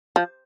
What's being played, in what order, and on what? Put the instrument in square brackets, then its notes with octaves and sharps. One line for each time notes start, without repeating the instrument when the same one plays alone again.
[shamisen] F3